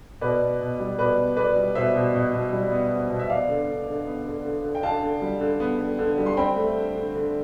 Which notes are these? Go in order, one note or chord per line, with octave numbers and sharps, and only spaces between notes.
B2 B4 D5
B3
B2
G3
B2 B4 D5
B3
B3 B4 D5
G3
B2 C5 E5
B2
B2
B2
G3
B3
B3
B2
E5
B3 D5 F5
D3
D3
D3
B3
D3
D3
D3
G5
D3 F5 A5
D3
G3
D3
B3
D3
D3
G3
C6
C4 G5 B5
A3
D3
D3
D3